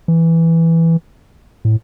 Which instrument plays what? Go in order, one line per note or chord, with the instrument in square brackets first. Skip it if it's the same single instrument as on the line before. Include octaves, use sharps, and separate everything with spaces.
[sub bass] E3
A2